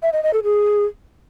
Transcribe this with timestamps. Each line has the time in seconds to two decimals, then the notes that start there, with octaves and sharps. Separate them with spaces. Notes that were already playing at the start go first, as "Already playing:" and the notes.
0.03 E5
0.13 D#5
0.23 D#5
0.34 A4
0.44 G#4